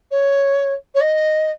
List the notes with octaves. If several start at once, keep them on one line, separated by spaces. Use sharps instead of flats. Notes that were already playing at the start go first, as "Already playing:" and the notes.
C#5
C#5
D#5